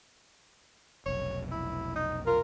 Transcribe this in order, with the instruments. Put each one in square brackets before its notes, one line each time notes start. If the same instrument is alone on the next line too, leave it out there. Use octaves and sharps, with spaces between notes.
[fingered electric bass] F1 B1 [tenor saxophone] C#5
[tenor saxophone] E4
D#4
[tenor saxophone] F4 [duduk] A#4